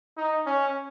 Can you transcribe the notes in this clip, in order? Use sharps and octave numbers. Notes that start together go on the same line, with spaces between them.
D#4
C#4